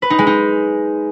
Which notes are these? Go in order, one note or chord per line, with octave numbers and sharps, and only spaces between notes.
B4
D#4
G#3
D#4